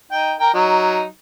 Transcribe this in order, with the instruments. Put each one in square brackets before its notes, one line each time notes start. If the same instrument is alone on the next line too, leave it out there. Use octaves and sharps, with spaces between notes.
[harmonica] D#4 G5
A#4 G5
F#3 D#4